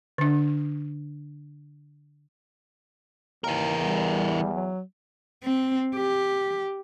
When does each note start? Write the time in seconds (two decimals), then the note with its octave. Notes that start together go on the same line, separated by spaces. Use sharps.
0.18 D3 D4
3.44 D#2 E3 A#4
3.78 E2 G3
4.54 F#3
5.44 C4
5.96 G4